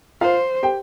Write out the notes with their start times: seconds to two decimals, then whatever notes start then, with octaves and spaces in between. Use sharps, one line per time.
0.21 F4 C5 F5
0.63 G4 G5